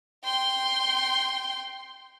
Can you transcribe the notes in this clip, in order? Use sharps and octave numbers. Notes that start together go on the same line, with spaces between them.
G5 C6